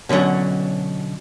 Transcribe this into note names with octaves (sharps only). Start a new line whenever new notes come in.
B2 D3 F3 F#3 C#4